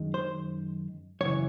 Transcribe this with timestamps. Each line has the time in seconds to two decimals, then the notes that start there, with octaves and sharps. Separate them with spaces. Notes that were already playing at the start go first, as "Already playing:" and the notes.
Already playing: F#2 D#3 G#3
0.14 C5
1.21 F#2 C#3 E3 C#5